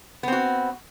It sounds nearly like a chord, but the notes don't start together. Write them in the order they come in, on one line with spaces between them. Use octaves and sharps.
B3 C4 F#4